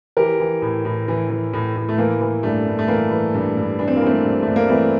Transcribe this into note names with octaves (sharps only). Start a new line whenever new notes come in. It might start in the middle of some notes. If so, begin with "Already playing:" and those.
E3 G4 A#4
E3
A2
A2
E3
E3
A2
A2
A3
E3 A#3
E3
G2 A3
G2
A3
E3 A#3
E3
G2
G2
E3 D4
C4
A#3
E3
A3 C4
G2
G2 A3
A#3
E3 A3 C4